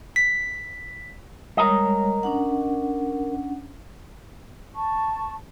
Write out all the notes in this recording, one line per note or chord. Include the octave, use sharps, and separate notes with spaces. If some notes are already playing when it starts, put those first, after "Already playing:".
B6
G3 G#3 A#4 C#5 D#5
C#4 D4 F#5
A5 C#6